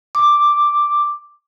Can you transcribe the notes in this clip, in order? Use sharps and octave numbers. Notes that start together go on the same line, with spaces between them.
D6